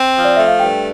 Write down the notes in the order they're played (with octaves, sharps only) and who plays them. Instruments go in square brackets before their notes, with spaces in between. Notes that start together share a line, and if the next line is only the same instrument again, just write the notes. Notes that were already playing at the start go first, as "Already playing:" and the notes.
Already playing: [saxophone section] C4
F3
[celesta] D5
[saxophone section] A3 [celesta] E5
[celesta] F5
[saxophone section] G2 [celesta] G5